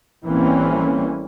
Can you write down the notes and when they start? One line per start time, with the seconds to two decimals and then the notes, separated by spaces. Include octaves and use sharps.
0.25 A1 E3 G3 A#3 C4 C#4